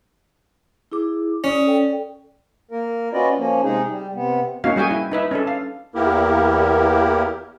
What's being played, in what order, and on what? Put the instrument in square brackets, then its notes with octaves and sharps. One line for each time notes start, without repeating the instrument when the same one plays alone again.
[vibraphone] E4 G#4 D6
[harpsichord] C#4 [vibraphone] D5 D#6
[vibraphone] A4 D5 G5
[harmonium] A#3 A#4
C#4 F4 F#4 B4 D5 D#5
F3 A#3 C#4
C3 G#3 D#4 G#4
G3
C3 B3
[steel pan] A#3 C#4 D#4 F#4 F5
G3 F#4 G#4 G5 G#5
E4
D#4 B4 E5
C#4 D4 A4
F5
[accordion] E2 A#3 B3 E4 G4 A#4